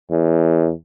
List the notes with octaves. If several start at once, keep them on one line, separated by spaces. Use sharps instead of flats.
E2